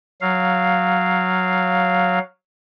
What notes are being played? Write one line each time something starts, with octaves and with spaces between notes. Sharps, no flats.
F#3 F5